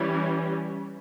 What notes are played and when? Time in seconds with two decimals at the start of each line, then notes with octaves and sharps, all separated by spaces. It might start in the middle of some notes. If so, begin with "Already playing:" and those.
Already playing: E3 G3 C#4